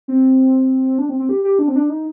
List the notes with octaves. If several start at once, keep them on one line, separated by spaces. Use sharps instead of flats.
C4
D4
C4
C4
G4
G4
D4
C4
D4
D#4